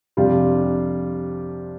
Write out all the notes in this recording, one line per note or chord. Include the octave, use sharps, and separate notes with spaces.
F2 C3 G3 D4 F4